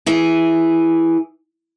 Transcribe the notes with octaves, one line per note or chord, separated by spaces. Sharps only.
E3 G#4